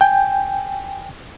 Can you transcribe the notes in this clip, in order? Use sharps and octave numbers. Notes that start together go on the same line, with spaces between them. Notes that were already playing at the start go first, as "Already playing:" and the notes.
G5 G#5